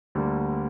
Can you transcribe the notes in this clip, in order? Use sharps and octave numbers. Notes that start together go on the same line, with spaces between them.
D2 D3 G3 A#3